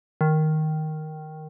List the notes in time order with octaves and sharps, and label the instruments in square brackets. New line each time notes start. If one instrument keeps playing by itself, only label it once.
[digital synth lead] D#3